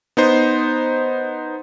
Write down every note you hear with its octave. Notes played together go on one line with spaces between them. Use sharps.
B3 D#4 C5